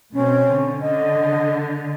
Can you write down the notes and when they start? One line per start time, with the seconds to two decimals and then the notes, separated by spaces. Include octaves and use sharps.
0.14 B2 C4 C#4
0.49 D3
0.81 D3 D#5